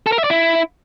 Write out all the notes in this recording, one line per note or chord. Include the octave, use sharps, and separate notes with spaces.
A4
A#4
E5
D5
E4